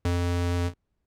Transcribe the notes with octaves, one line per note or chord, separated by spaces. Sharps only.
F2